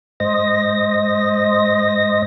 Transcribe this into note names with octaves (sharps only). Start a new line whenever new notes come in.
G#2 C5 D#5 A#6